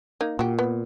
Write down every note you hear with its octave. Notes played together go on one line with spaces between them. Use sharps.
A#3 D#4
A#2 F#4 G4
B3